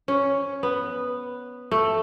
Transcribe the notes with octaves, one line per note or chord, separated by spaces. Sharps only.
C#4
B3
A3